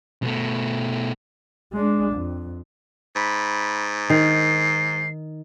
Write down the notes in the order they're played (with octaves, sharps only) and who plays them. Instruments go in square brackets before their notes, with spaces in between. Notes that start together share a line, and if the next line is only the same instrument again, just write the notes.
[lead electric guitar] B2 A3
[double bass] G#3 D4
F2
[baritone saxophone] G#2 [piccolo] B5
[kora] D#3 [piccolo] C7